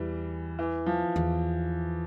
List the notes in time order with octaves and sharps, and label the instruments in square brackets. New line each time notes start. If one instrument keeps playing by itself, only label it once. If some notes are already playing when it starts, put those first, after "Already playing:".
Already playing: [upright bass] E2 [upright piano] E3 G3
[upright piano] E3
F3
[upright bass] E2